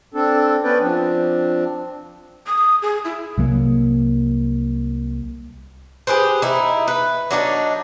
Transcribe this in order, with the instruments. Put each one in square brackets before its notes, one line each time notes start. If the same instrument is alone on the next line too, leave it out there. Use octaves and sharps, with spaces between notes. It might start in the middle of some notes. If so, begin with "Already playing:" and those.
[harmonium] C4 D4 A4
B3 C#4 B4 D5 G5
F3 C4 D4
[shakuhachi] D#6
G#4
E4
[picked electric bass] C2 F#3 A#3
[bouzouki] G4 G#4 B4 C5
D#4 E4
B4
F#3 D4 D#4